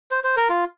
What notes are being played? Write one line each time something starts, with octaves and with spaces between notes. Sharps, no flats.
C5
C5
A#4
F4